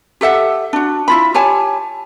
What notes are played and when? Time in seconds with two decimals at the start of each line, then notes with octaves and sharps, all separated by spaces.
0.21 G4 A4 E5 F#5
0.73 D4 F#4
1.08 E4 F4 B5
1.34 G4 C#5 G#5 A5